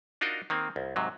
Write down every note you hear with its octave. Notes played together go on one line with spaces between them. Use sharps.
D4 D#4 F4 F#4 A#4 D#5
D#3 A#3 C4
C2
G#2 C3 F#3